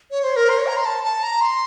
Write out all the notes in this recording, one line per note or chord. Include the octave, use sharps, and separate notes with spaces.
C#5
C5
A#4
C5
C#5
A#5
C6
A5
A5
A#5
C6